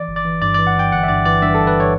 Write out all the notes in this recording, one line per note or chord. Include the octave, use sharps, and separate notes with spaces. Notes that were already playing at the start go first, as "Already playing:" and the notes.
Already playing: E3 D5
G1
D5
E3
G2 D5
E3 D5
F#5
G2 G5
G1 F#5
E5
G2 D5
E3 D5
G2 E5
G1 A4
B4
C#5